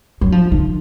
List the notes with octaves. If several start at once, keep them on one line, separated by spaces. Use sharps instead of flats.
F#3
F3
D#3